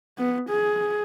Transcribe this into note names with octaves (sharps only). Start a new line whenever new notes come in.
B3
G#4